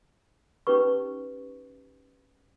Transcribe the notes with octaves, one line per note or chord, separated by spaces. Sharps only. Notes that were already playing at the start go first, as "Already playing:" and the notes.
C#4 D#4 G4 B4 C#6